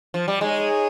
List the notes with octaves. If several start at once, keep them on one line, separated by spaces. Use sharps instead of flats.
F3
G3
G#3 D#4 G#4 C#5 G#5